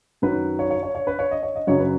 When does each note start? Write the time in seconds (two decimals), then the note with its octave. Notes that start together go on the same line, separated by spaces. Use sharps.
0.22 F#2 D#3 F#3 B4
0.59 C#5
0.70 C#5
0.83 C#5
0.95 C#5
1.07 B4
1.19 C#5
1.31 D#5
1.43 C#5
1.55 D#5
1.67 F#2 C#3 F#3 C#5
1.80 B4